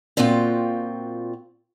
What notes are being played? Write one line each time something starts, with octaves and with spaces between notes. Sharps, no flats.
A#2 C4 F4 F#4 G5